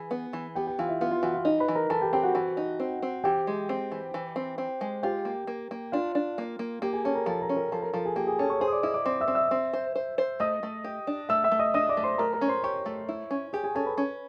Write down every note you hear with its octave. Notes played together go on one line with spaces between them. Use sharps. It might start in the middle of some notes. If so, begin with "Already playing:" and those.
Already playing: E3 G#4 G#5
B3
E3
B3 G4 G5
G4 G5
E3 F4 F5
E4 E5
B3 F4 F5
F4 F5
E3 F#4 F#5
F4 F5
D#4
B4 B5
E3
A#4 A#5
E3 A4 A5
G4 G5
C4 G4 G5
F#4 F#5
E3
D#4
C4
C4
E3 G4 G5
G#3
C4
E3
E3
C4
C4
G#3
F4 G4 G5
A#3
A#3
A#3
D4 F4 F5
D4
A#3
A#3
A#3 G4 G5
G#4 G#5
C#4 A4 A5
A#4 A#5
F3 A4 A5
A#4 A#5
C#4
A#4 A#5
F3 A4 A5
A#4 A#5
F3 A4 A5
G#4 G#5
A#3 G4 G5
G#4 G#5
C#4 A4 A5
C#5 C#6
G#4 C5 C6
D#6
D5 D6
E4 D#5 D#6
D5 D6
C4 D5 D6
E5 E6
C4
E5 E6
C4
C5
C5
C5
A3 D#5 D#6
A3
G4
D4
A3 E5 E6
E5 E6
A3
D#5 D#6
D4 D#5 D#6
D5 D6
A3
C5 C6
A3 A#4 A#5
A#4 A#5
C#4
C5 C6
G4 C#5 C#6
A3
E4
C#4
G4 G#4 G#5
G#4 G#5
C#4 A4 A5
B4 B5
C#4